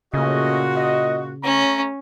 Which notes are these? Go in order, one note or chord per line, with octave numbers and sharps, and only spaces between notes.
A#2 C#3 A3 C#4 F#4 D#5
D#5
A3 C#4 C#5 A#5